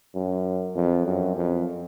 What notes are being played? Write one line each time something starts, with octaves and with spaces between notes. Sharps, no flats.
F#2
F2
F#2
F2